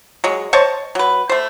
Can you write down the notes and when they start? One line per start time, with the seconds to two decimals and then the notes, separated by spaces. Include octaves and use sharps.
0.24 F#3 G#3
0.53 C5 C#5 D#5 A5
0.95 F#3 B4
1.29 A3 C5